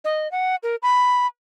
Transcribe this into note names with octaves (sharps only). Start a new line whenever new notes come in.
D#5
F#5
A#4
B5